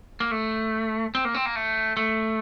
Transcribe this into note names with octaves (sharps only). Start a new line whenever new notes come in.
A#3
A3
C4
A#3
C4
A#3
A3
A3